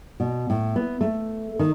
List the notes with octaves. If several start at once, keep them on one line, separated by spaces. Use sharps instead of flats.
B2
A2
B3
A3
D#3